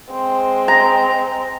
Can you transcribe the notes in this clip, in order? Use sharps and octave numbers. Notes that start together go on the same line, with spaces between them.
G#3 C4
A#5